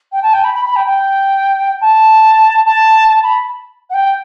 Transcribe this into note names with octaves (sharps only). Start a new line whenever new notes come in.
G5
A5
G5
B5
B5
B5
G5
G5
A5
A5
A5
B5
F#5
G5